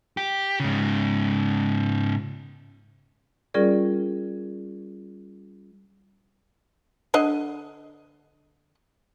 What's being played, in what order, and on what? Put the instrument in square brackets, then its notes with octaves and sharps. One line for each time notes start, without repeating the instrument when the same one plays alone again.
[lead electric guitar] G4
G#2 C#3
[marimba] G3 C#4 F4 G#4 A#4 D5
[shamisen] D3 D4 D#5